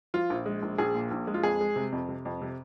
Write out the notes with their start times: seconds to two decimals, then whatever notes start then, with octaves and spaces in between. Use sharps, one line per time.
0.14 F3 F4
0.30 A#1
0.46 G#3
0.63 A#1
0.78 A#1 G#4
0.95 A#2
1.11 A#1
1.27 G#3
1.34 F4
1.43 F2 G#4
1.61 G#3
1.76 C3
1.92 F2
2.09 C3
2.25 F2
2.41 C3